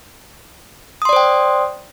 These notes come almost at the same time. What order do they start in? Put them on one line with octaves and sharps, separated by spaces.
D#6 C6 D5 C5 G5